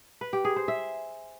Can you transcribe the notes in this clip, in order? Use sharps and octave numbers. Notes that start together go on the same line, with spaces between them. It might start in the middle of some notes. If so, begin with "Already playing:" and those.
B4
G4
G#4
C5
E5